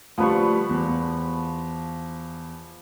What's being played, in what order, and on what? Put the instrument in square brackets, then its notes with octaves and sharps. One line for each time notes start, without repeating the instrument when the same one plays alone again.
[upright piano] D2 G3 [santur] F3 B4 C#6
[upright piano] E2